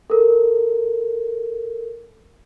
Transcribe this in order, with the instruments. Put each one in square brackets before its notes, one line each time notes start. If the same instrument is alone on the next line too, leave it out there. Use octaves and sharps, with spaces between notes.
[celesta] A4 A#4